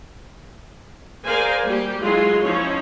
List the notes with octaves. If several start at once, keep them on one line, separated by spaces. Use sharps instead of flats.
G#4 A#4 C5 D5 F5 G#5
G3 A#3 G4
F#3 G#3 E4 F4 G#4 C6
F3 C#4 D#4 E4 C#5